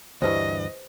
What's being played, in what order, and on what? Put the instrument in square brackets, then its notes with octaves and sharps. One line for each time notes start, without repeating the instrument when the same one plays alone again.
[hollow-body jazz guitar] D2 G2 E3 [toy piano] G4 B4 C5 [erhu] D#5